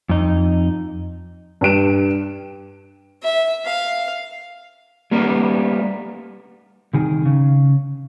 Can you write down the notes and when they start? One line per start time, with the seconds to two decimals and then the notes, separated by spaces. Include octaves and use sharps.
0.09 F2 D#4
1.61 G2 G4 D7 E7
3.23 E5
3.65 F5
5.11 G3 A#3 B3 A#4
6.94 C2 D#3 G#4
7.25 C#3